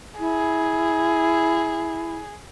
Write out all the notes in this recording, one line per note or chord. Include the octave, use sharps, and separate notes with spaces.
E4 G#4